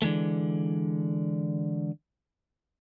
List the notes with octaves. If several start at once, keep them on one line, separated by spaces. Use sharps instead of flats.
D3 E3 G#3 A3